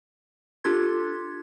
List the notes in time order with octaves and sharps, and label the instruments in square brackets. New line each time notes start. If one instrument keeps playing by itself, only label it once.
[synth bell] D4 F4 G4 A4 C6 G#6